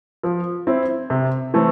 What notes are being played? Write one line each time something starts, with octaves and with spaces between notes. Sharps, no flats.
F3
C4 E4
C3
E3 A3 C4